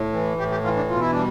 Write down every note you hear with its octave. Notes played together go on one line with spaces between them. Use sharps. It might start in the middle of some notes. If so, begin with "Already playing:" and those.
Already playing: A2
E3
A2 G4
G4
E3 F4
D4
B2 F4
E4
G3 D4